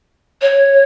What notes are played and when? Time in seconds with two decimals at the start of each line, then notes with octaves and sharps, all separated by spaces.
0.42 C#5